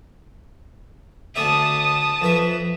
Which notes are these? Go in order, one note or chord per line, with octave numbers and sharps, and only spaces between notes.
D2 D5 E5 A5 D#6
F2 B4 E5